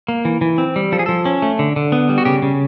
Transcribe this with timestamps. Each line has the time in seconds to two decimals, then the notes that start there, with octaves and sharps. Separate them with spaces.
0.08 A#3
0.25 E3
0.41 E3
0.58 C4
0.76 G3
0.92 F3 A4
0.99 G#4
1.06 F3 A4
1.26 C#4
1.42 A3
1.59 D3
1.76 D3
1.92 B3
2.09 G3
2.18 F#4
2.25 C#3 G4
2.42 C#3